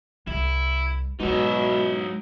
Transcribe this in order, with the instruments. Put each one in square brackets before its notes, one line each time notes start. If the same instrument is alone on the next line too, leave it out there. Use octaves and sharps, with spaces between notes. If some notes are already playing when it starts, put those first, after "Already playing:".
[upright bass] C2 [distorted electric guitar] E4
[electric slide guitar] G#2 F#3 [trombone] B2 [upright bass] E3 G#3 [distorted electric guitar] D#4 E5